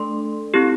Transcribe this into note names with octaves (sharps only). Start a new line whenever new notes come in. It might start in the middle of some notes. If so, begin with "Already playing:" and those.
Already playing: A3 D4 A4 C6
C4 E4 G4